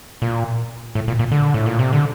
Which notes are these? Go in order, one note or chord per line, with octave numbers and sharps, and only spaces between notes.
A#2
A2
A#2
A#2
D3
A2
A#2
C3
D3